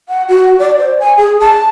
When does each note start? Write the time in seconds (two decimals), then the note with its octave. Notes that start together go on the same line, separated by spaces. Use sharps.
0.09 F#5
0.29 F#4
0.59 D5
0.79 C5
1.00 G#5
1.17 G#4
1.40 A5